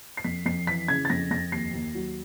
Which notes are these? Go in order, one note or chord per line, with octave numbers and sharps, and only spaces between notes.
C7
F2 B6
F2 C7
E3 B6
C#3 G#6
A6
F2 A#6
F2 A#6
D#2 C7
D#2
F#3